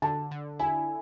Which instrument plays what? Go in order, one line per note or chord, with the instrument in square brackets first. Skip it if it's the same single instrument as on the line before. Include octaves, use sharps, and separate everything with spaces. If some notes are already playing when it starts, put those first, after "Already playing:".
[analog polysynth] D3 [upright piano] A5
[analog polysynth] D3
[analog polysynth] E4 [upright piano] G#5